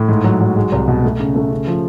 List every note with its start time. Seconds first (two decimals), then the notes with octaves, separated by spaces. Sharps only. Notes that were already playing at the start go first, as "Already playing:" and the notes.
Already playing: A2
0.09 G#2
0.24 F#3
0.41 F#3
0.56 G#3
0.72 C2
0.88 B2
1.04 A3
1.20 C#3
1.36 A3
1.52 C#3
1.67 F3